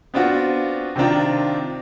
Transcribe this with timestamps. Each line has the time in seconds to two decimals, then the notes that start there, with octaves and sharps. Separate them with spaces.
0.14 B3 C4 D4 F4 F#4
0.96 C3 D#3 C4 D4 F4